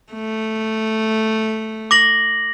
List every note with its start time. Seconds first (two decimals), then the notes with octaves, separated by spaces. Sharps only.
0.12 A3
1.91 D6 A#6 F#7